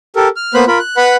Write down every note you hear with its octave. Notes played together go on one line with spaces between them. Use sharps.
G4 A4 A#4
F6
A#3 B3 B4 C5 B5 F#6
F4 A#4 B5
F#6
B4 F#5 B5